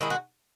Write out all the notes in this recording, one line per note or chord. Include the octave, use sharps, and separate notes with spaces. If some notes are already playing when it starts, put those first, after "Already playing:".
D#3 G#3 D#4 E4
F#4